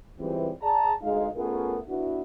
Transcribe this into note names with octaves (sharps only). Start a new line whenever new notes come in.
C#2 E3 G3 C4
G#4 D5 A5 A#5
D2 G#3 D#4 F5
A3 B3 C#4 F4 G#4 A#4
B3 D4 E4 F#4